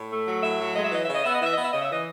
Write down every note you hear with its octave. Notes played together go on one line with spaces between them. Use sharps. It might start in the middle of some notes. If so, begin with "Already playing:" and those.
Already playing: A2
A3
F#3
A2 E5
F#3
G#3 D#5
E5
E3 D#5
C#3 E5
D#5
B3 E5
D#5
E3 E5
B3 D#5
E5
C#3 D#5
E5
E3 D#5